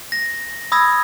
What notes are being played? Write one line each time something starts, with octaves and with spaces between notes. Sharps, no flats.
A#6
B5 D#6 E6 G#6 A#6